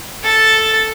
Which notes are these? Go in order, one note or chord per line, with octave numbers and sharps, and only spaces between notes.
A4 A5